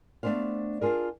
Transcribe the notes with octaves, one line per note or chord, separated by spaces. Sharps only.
A3 B3 D4 C5 F5
D4 F4 G#4 A#4